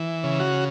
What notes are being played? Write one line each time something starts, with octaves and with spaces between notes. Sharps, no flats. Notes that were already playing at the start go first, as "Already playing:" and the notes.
Already playing: E3
C#3
F#4